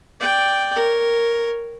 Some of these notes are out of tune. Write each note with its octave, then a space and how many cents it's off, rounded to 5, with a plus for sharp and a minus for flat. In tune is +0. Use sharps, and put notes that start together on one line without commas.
D5 +0 G5 +0
A#4 +0 C#5 +0